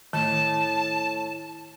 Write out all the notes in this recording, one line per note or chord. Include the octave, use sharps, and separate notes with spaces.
A2 D#3 A5